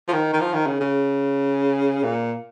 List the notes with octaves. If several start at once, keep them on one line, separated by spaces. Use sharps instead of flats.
F3
D#3
D#3
F3
D#3
C#3
C#3
A#2